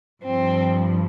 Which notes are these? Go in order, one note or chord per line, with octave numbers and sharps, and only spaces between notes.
G2 F3 C4